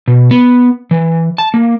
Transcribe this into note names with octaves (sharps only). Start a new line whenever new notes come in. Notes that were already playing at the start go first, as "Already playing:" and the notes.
B2
B3
E3
A5
A#3